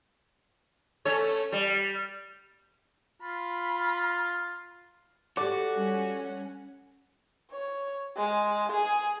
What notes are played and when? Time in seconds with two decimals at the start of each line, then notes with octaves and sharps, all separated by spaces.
1.05 A3 C#4 C#5
1.52 G3
3.22 F4 B5
5.37 F#4 G4 A4 D5
5.74 G3 C#4 F#5
7.51 C#5
8.16 G#3
8.72 G#4